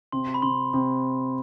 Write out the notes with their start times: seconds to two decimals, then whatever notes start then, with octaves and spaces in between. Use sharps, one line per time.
0.12 C3 C6
0.34 B5
0.42 C3 C6
0.74 C3